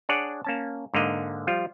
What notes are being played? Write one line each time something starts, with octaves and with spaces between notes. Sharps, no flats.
D4 G#4 C#5 D5 F#5
A#3 C#4 A5
G#2 D3 A#3 D#5
F3 G3 F4